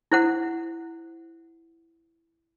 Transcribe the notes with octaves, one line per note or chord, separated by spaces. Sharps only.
E4 C5 F#5